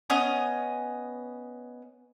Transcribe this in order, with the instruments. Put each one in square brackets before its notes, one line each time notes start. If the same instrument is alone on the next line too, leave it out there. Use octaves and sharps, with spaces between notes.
[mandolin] B3 C#4 D#5 D#6